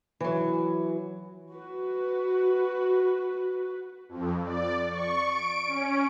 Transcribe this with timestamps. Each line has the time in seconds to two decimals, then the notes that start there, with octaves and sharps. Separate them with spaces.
0.20 E3 F#3
1.53 F#4 B4
4.09 F2
4.43 D5
4.90 C#6
5.26 D7
5.66 C#4